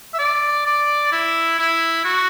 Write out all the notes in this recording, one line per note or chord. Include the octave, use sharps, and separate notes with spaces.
E5
D5
D5
E4
E4
F#4